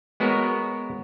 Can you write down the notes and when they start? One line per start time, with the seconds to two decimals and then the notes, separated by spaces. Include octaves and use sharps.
0.20 G#3 B3 F#4 A#4 C#5